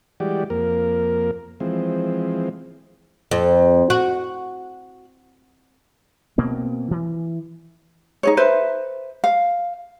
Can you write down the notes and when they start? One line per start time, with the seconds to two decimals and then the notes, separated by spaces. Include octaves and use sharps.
0.20 E3 G3 G#3 F#4 G4 D5
0.50 F2 A#3 A#4
1.60 E3 F3 G#3 C4
3.31 F2
3.90 F#4
6.38 B2 A#3 C4
6.91 E3
8.23 D#4 G#4 C#5
8.37 B4 C5 E5
9.24 F5